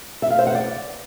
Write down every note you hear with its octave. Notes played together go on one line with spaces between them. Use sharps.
E5
F5
C5
F#5
D5